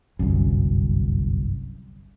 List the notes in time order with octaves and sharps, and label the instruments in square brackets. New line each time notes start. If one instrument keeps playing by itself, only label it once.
[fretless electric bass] G1 C2 F#2